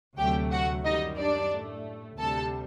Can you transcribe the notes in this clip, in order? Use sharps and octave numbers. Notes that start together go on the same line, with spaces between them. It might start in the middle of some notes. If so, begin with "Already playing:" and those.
D2 C3 F#3 A3 G4 G5
F#4 F#5
F#2 D#3 G3 D#4 D#5
D4 D5
A2 A3
D2 C3 G3 A4 A5